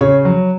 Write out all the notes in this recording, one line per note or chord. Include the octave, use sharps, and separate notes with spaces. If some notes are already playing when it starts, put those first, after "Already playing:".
C#3 C#5
F#3